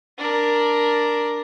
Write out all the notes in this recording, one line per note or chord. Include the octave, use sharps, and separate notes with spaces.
D4 A#4